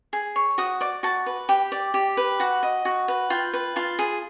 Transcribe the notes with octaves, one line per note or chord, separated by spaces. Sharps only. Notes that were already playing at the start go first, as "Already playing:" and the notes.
G#4
C#5
F#4 D#6
D5 D6
F#4 A5
B4
G4 G5
D5
G4
B4
F#4 F#5
D#5
F#4
B4
F4 G5
B4
F4 A5
G#4